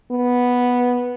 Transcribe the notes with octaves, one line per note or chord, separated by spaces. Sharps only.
B3